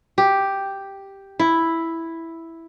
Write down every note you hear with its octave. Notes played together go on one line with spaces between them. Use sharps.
G4
E4